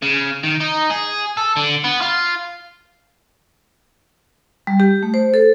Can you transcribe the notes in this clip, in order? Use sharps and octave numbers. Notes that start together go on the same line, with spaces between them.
C#3
D#3
D#4
G#4
A4
D3
B3
F4
G3
G4
A3
C5
A4